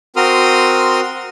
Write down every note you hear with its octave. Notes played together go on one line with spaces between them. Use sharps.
C4 F#4 A#4 C6 D#6 F6